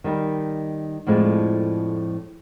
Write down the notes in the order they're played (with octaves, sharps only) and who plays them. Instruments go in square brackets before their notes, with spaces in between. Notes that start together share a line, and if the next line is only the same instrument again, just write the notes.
[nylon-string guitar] D#3 G3 D#4 A#4
F2 A2 F3 G#3 D4